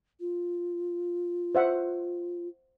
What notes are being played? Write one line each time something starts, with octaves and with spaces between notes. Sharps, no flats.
F4
C5 E5 F#5